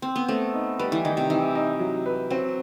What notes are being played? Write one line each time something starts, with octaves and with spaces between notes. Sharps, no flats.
C4
B3
A3 C4
D#4
G3 B4
E3
D#3 D#4
C3
E3 D#4
D#4
F#3
B4
F#3 C4